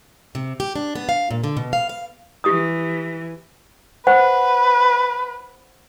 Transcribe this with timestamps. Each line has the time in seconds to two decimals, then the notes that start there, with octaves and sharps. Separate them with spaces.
0.35 C3
0.60 G4
0.76 D4
0.95 B3
1.09 F5
1.31 A#2
1.44 D3
1.57 B2
1.73 F5
1.89 F5
2.44 E3 G4 D#6
4.07 B4 C5 F#5